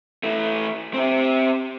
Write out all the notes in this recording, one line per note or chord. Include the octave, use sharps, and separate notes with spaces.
E3 A3
C4 G4